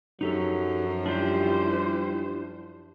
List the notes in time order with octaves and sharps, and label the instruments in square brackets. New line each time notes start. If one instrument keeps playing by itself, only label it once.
[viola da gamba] F#2 F3 [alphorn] F#3 [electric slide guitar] D#4 G4 A4
[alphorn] G3 [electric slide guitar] D4 F4 G4 [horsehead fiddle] E4 C5